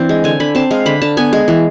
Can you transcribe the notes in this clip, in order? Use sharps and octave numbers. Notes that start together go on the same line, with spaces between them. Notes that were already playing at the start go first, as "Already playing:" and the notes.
Already playing: E3 C4 D4
G#3
D3 G#5
D3 B5
C4 A5
G#3 F5
D3 B5
D3 A5
B3 G#5
G#3
E3